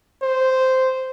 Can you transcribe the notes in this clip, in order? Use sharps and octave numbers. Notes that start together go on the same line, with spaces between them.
C5